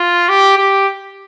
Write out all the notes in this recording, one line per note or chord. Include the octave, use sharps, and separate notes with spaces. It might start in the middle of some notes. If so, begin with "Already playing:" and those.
Already playing: F4
G4
G4